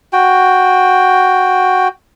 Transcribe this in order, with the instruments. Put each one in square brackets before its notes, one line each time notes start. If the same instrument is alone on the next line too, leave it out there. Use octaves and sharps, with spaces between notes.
[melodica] F#4 G5